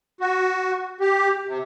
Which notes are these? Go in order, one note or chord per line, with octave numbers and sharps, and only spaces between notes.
F#4
G4
C3